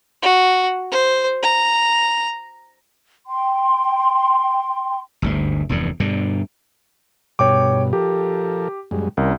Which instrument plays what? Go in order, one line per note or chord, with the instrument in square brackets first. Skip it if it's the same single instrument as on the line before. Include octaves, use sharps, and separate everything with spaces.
[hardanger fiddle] F#4
C5
A#5
[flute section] G5 C6
[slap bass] G1 D2 G#2
F1 E2 G2 D3
G2 B2 D3
[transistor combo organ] G2 B2 [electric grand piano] C#5 G5 D6
[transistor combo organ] F3 A4 A#4 [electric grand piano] G4
[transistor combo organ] F#2 G3 G#3
[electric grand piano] C2 [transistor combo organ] C#4 A#4